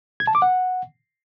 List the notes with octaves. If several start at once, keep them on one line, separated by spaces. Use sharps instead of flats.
G#6
A5
D6
F#5